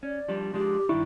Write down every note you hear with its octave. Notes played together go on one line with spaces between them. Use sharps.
C#4 D5
F3 G3 D4
F3 G#3 D4 G4
G2 D#3 D4 E4 C#6